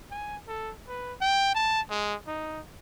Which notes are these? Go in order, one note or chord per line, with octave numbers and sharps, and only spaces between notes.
G#5
A4
B4
G5
A5
G#3
D#4